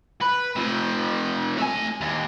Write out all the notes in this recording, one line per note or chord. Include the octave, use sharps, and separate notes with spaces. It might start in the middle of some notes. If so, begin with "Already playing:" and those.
B4
C3 F3
A3 G#5
D#2